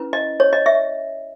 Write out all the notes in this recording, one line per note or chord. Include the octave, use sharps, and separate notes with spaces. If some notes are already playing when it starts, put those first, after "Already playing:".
Already playing: C#4 E4 B4
D#5
C#5
D#5
E5